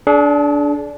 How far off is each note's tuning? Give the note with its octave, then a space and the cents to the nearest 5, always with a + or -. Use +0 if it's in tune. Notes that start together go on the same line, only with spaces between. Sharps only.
D4 -15 G#4 +40